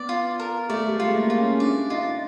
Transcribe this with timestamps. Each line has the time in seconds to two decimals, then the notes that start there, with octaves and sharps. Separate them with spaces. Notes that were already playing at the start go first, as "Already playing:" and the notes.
Already playing: B3 D5
0.09 F4
0.40 A#4
0.69 A3 D5
0.87 G3
0.92 G#3
1.00 A3 F4
1.14 A#3
1.30 F4
1.38 C#4
1.60 D4 D5
1.90 D#4 F4